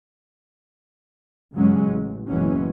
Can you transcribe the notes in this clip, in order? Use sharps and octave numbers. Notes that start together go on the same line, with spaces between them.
G2 C#3 F#3 G#3 C#4
A1
F#1 B2 E3 F#3 G#3 C#4